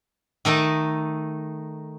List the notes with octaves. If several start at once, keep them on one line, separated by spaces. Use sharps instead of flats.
D#3 A3 D#4 A5